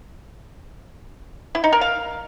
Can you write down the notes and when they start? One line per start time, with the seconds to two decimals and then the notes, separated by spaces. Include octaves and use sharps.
1.55 E4
1.64 D#4
1.73 A#4
1.81 F5